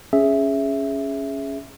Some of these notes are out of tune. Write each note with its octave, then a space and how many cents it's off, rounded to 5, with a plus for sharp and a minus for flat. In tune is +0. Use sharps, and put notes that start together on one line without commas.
C#4 +0 G#4 +0 E5 +0